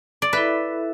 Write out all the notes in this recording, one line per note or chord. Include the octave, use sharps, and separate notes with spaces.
D5
E4 A4 B4 E5